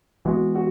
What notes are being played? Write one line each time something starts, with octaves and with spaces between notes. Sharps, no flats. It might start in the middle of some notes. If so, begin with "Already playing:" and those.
E3 G#3 B3 F#4
F#4